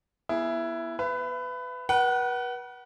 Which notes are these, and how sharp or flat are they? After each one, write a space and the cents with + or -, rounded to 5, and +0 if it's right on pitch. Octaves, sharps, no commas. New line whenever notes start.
B3 -30 E4 +15 G#4 +0
B4 +20 E5 +40
B4 -35 F#5 +25